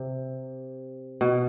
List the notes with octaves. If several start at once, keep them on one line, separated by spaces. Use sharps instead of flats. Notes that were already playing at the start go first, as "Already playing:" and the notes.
Already playing: C3
B2